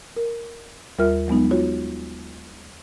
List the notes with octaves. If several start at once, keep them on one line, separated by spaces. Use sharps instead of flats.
A#4
D#2 G3 F4 A#4 E5 F6
F#3 G#3 B3 D#4
F4 F#4 C#5